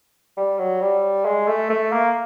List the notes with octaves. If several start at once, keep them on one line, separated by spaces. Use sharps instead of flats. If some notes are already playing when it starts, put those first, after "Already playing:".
G3
F#3
G3
G#3
A3
A3
A#3